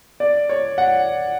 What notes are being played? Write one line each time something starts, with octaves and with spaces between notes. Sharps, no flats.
D5
C#5
F#5